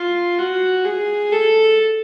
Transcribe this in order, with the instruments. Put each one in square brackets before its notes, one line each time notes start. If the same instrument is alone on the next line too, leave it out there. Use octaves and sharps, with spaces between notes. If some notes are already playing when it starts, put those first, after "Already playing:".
Already playing: [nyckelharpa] F4
F#4
G#4
A4